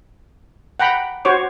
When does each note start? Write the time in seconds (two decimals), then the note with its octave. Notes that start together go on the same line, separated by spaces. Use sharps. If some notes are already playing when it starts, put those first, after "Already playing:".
0.80 F#5 G5 A#5 B5
1.25 F#4 C5 C#5 D6